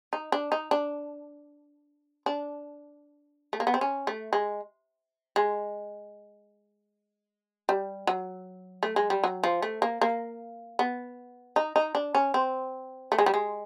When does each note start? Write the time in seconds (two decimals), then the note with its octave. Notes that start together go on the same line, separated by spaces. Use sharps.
0.13 D#4
0.32 D4
0.52 D#4
0.71 D4
2.26 D4
3.53 A3
3.60 A#3
3.67 B3
3.74 C4
3.81 C#4
4.07 A3
4.33 G#3
5.36 G#3
7.69 G3
8.07 F#3
8.83 A3
8.96 G#3
9.10 G3
9.24 F#3
9.44 F3
9.62 A3
9.82 A#3
10.01 A#3
10.79 B3
11.56 D#4
11.76 D#4
11.95 D4
12.15 C#4
12.34 C4
13.12 A3
13.18 G#3
13.26 G3
13.34 G#3